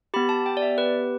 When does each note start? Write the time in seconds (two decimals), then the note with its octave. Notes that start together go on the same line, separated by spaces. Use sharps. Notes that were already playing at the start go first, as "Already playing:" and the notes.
0.14 B3 G4 B5
0.29 A5
0.46 G5
0.57 D5
0.62 E5
0.78 B4